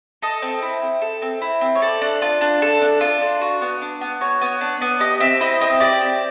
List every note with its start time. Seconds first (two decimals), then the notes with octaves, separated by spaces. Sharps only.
0.22 A4 D#5
0.42 C4
0.62 E4
0.82 C4
1.02 A4
1.22 C4
1.42 E4
1.61 C4
1.75 C#5
1.82 A4 D5
2.02 D4
2.22 F4
2.41 D4
2.62 A4
2.82 D4
3.01 F4
3.21 D4
3.41 F#4
3.61 B3
3.82 D4
4.01 B3
4.21 F#4 C#5
4.41 B3
4.61 D4
4.81 B3
5.00 G4 D#5
5.20 C4 E5
5.41 E4 D#5
5.61 C4 D#5
5.80 G4 D5
6.01 C4